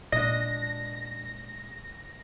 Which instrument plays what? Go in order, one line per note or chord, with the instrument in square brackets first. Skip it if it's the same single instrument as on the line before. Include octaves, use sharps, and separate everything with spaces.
[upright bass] A#2 G#3 [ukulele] D4 D#5 [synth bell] A#6